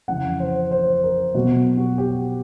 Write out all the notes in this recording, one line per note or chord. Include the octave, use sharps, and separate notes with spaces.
F2 C#3 E3 F#5
C5
C5
A#4
B2 F#3 B3 F#4
F#4
G4